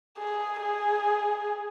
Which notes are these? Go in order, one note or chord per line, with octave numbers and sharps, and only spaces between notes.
G#4
G#4